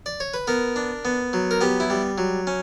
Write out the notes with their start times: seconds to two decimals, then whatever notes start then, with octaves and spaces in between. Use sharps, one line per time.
0.06 D5
0.20 C#5
0.34 B4
0.47 B3 A#4
0.76 D4
1.05 B3
1.33 F#3
1.51 A#4
1.61 B3 G4
1.80 E4
1.90 G3
2.18 F#3
2.47 C#4